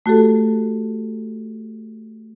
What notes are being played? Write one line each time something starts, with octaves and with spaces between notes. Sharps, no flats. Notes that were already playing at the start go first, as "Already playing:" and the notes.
A3 F#4 G4 A4